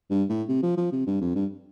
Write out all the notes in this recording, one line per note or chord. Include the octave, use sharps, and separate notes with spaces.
G2
A2
C3
F3
F3
C3
G2
F2
G2